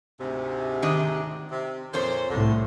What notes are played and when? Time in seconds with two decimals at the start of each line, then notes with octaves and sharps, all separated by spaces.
0.19 D2 G#2 C3
0.82 D#3 D4 D#5
1.51 C3
1.93 F2 A#2 A4 C5 C#5
2.30 C2 A2 D3